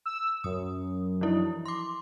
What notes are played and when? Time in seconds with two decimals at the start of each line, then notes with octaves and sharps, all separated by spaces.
0.06 E6
0.44 F#2 D#6
1.21 E3 F3 E4
1.66 C6 D6